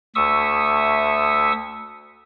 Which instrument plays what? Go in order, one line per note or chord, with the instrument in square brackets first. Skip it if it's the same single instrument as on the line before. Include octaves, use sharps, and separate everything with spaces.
[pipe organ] D2 E5 C#6 D#6 E6